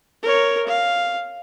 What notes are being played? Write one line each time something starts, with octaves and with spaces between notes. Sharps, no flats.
A#4 C#5
F5